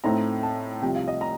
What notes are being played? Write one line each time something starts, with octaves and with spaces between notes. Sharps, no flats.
A2 A3 C4 D#4 A#5
A5
C2 C3 F3 G5
F5
D#5
A#5